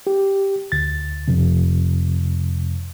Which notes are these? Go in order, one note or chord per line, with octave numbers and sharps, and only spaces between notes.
G4
D2 A6
F2 C3